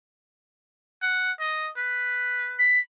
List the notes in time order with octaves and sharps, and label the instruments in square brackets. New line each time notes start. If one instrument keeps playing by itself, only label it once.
[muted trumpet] F#5
D#5
B4
[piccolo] B6